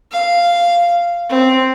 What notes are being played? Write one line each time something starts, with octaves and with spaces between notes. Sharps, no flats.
F5
C4